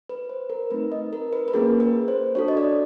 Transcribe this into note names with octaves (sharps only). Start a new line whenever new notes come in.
B4
C5
A#4
A3 C4 D#4 B4
D#5
A#4
B4
B4
A#3 C#4 F4 G#4 A#4
B4
C5
D4 F#4 A4 C#5
D#5
D5